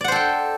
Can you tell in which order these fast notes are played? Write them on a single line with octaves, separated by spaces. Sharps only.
D5 F#5 C5 A4 G5